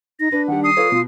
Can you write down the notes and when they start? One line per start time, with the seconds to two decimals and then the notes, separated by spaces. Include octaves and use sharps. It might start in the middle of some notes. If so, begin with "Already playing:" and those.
0.20 D#4 A#6
0.32 D4 B4
0.48 D#3 G3 F#5
0.64 D#6 C7
0.77 F4 A4 B4 C#5
0.92 B2 F4